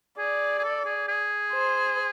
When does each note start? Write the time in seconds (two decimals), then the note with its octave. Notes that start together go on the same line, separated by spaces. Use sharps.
0.18 G#4 D5
0.59 G#4
0.64 A4
0.86 G#4
1.08 G#4
1.53 C5